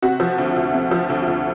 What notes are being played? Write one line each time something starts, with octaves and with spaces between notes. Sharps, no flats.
C3 F#4
F3
D2
D2
C3
F3
D2
D2